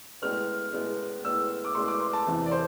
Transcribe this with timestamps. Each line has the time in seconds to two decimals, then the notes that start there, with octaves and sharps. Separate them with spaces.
0.22 A2 G#3 B3 F6
0.73 A2 G#3 B3
1.24 A2 G#3 B3 E6
1.65 D6
1.75 A2 G#3 B3 C6
1.88 D6
2.00 C6
2.13 A5
2.27 E2 C3 E3
2.46 D5
2.52 C5